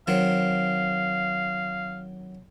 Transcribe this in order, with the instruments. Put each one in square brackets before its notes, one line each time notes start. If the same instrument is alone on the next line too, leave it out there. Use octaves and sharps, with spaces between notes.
[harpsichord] D#3 F#3 C4 [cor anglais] F5